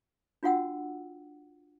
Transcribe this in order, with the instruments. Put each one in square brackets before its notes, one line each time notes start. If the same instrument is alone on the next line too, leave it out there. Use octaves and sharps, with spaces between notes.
[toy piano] D4 F4 F#4 F#5 G5 E6